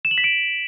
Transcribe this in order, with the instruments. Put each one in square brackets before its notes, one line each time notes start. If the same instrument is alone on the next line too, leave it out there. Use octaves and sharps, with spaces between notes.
[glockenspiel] E7
F#7
B6
D7